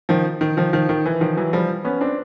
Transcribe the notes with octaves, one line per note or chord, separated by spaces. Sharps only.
D#3 F3
D#3
D#3 F3
D#3 F3
D#3
E3
D#3 F3
E3 F#3
F3 G3
B3 C#4
C4 D4